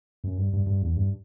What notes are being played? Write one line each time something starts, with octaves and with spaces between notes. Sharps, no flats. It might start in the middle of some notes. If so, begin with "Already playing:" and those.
F#2
G2
G2
G2
E2
G2